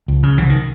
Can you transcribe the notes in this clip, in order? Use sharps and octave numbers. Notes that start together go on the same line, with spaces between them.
C#2
C#3
C2 E3
D#3